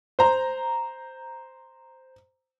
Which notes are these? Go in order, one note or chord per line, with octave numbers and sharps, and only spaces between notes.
C5 A#5